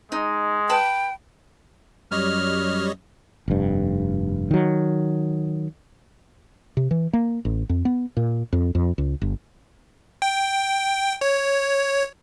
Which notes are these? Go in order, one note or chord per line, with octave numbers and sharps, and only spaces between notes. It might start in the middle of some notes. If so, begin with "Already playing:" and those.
G#3 D#4
B4 G5 A5 B5
F#2 G3 C#5 D#5 F6
F1 G2
D#3 F#3
C3
E3
A#3
A1
F2
B3
A#2
F2
F2
C#2
G1
G5
C#5